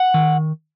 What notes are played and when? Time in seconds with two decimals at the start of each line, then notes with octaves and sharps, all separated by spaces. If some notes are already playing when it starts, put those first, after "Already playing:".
Already playing: F#5
0.14 D#3